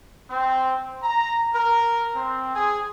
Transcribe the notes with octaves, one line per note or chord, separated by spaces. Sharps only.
C4
A#5
A#4
C4
G#4